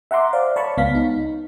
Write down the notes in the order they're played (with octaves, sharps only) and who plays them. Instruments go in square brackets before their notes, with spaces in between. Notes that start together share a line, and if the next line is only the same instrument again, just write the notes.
[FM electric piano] E5 F#5 A#5 C6 D6
C5 D5 F5
C#5 A5 B5 C#6
C#2 B3 F5 B6
D#4